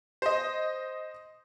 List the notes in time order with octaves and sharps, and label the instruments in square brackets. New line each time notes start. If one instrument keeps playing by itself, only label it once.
[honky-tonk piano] C5 D#5